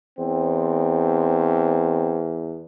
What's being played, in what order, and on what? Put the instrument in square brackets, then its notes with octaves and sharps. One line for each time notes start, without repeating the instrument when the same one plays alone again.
[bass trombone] E2 [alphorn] C4